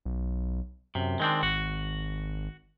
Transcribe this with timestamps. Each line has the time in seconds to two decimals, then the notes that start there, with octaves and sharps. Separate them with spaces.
0.05 B1
0.95 F#2 C3
1.20 D#3 G#3 C4 D4
1.43 G#1 F#4